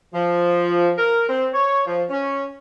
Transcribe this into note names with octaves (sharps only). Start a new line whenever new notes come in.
F3
A#4
C4
C#5
F3
C#4